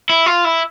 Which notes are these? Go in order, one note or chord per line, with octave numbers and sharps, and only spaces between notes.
E4
F4
E4